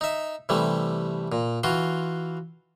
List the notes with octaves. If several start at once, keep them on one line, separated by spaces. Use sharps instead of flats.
D#4 E5
C3 E3 G3 A3
A#2
E3 F4 F#4 C6